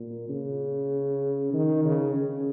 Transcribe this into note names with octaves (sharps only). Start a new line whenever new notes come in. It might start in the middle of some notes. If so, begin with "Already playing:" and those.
Already playing: A#2
C#3
D#3
C#3
C#3